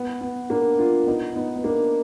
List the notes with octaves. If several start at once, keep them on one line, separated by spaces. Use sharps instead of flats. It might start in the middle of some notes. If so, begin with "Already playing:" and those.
Already playing: B3
B3
A#3 D4
D4 F4
B3 D#4
B3 D#4
B3
A#3 D4